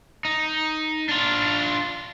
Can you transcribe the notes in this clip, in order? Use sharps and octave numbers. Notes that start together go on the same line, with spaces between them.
D#4
D4 F4